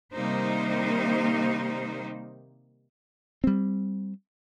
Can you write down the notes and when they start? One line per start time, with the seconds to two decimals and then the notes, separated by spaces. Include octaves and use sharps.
0.13 C3 D#3 G3 A#3 D#4 C5
3.44 G3 C4